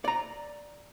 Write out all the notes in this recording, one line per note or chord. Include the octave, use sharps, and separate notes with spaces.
D5 A#5